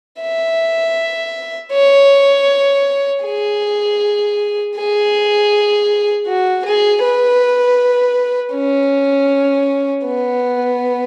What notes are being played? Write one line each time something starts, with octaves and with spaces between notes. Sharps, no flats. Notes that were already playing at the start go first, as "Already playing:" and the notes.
E5
C#5
G#4
G#4
F#4
G#4
B4
C#4
B3